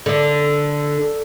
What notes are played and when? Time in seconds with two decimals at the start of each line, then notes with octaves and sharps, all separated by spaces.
0.06 D3